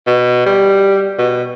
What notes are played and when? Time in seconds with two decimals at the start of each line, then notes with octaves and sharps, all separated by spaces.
0.07 B2
0.46 G3
1.19 B2